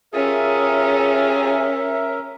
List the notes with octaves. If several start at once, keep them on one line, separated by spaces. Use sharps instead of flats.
C#4 F4 G4 G#4 A#4 E5